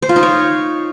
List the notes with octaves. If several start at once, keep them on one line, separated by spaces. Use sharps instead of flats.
C5
F4
D#4
C#5